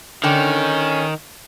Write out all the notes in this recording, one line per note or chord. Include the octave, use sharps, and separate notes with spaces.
D3 D#3 C#4 G5